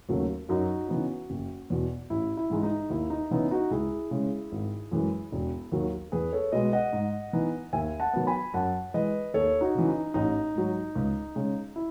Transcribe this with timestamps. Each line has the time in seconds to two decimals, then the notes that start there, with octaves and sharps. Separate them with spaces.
0.09 D#2 C#3 F#3 A3
0.49 F#2 D#4 F#4
0.89 C#3 E3 B3 D#4
1.30 F#1
1.70 E2 B2
2.10 A1 E4
2.37 E4
2.50 G#2 E3 G#3 D#4
2.63 D#4
2.90 D#2 E4
3.10 D#4
3.31 C#3 E3 B3 D#4 E4
3.51 D#4 F#4
3.71 C#2 E4 G#4
4.11 C#3 G#3
4.52 G#1
4.91 F#2 E3 G#3
5.32 E1
5.72 D#2 D#3 F#3
6.12 E2 G#4 B4
6.33 A4 C#5
6.52 B2 G#3 B4 D#5
6.73 D#5 F#5
6.93 G#2
7.33 E3 B3 D#4
7.73 D#2 E5 G#5
8.00 F#5 A5
8.13 D#3 F#3 B3
8.27 G#5 B5
8.54 F#2 F#5 A5
8.94 E3 G#3 B4 D#5
9.34 D#2 A4 C#5
9.61 D#4 F#4
9.75 C#3 E3
9.88 D#4
10.14 A1 D#4
10.55 G#2 F#3
10.95 C#2
11.35 C#3 G#3
11.76 E4